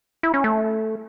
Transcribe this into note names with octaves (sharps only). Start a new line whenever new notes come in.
E4
C#4
A3